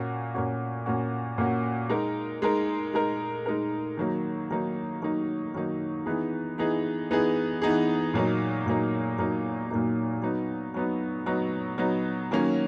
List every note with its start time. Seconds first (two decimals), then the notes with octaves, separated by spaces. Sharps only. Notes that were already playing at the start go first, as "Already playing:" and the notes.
Already playing: A#2 A#3 C#4 F#4
0.34 A#2 A#3 C#4 F#4
0.86 A#2 A#3 C#4 F#4
1.38 A#2 A#3 C#4 F#4
1.90 G#3 D#4 A#4
2.42 G#3 D#4 A#4
2.94 G#3 D#4 A#4
3.46 G#3 D#4 A#4
3.97 D#3 F#3 A#3 D#4
4.51 D#3 F#3 A#3 D#4
5.02 D#3 F#3 A#3 D#4
5.54 D#3 F#3 A#3 D#4
6.06 E3 B3 D#4 G#4
6.58 E3 B3 D#4 G#4
7.11 E3 B3 D#4 G#4
7.62 E3 B3 D#4 G#4
8.14 A#2 F#3 A#3 D#4
8.66 A#2 F#3 A#3 D#4
9.18 A#2 F#3 A#3 D#4
9.70 A#2 F#3 A#3 D#4
10.22 F#3 B3 D#4
10.74 F#3 B3 D#4
11.26 F#3 B3 D#4
11.78 F#3 B3 D#4
12.31 D#3 F#3 A#3 C#4